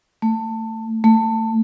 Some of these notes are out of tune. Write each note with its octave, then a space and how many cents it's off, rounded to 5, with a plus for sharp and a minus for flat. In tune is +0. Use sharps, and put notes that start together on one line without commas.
A3 +20
A3 +20